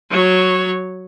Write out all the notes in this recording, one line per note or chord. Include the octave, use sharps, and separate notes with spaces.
F#3 C#5